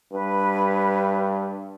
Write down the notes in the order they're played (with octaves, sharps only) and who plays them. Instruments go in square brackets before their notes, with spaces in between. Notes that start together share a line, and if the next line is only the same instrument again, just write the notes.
[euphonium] G2 [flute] B4